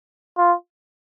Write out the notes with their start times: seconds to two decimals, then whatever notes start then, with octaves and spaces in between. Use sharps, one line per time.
0.38 F4